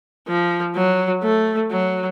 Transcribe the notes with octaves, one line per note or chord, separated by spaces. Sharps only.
F3
F#3
A3
F#3